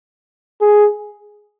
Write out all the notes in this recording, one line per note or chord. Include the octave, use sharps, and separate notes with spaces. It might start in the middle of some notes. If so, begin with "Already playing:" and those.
G#4